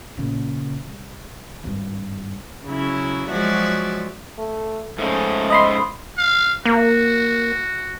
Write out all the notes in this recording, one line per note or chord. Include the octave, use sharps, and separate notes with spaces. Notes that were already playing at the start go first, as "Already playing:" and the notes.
A#2 C#3
C2
G#1 G2
C#3 F#3 E4
F3 F#3 G#3 F#4 D5 E5
A3
G#2 C#3 G#3 A3
D#5 B5 C6
F5
A#3 F#4